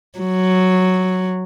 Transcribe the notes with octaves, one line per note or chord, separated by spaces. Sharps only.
F#3